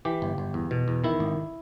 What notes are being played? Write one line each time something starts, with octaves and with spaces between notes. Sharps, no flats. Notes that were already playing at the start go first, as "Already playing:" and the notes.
E3 G4
G1
G1
E2
B2
E2
D#3 E4
G#1